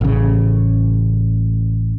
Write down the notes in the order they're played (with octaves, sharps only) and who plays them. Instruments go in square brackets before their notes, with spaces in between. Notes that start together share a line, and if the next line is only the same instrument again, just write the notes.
[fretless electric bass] A1 C#3